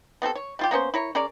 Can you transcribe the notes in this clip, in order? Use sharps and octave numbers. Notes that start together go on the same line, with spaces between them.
B3 C4 G4 A4
C#5
G3 F4 G4
A#3 B3 C#4 C5
E4 A#4 C#5
C#4 G#4 A#4 D5